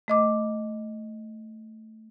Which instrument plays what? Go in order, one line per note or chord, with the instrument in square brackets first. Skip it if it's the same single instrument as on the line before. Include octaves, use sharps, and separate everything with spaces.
[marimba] A3 D#5 D6